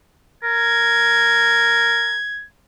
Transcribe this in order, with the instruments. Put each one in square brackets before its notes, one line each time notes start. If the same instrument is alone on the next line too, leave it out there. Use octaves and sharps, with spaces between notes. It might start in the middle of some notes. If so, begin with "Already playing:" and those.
[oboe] A#4 [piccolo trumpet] G#6